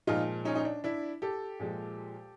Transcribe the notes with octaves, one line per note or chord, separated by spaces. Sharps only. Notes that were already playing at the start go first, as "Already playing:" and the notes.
A#2 F3 G#3 D#4 F4
C#4 D#4
D#4
D4
D4 E4
G4 A4
A#2 F3 G#3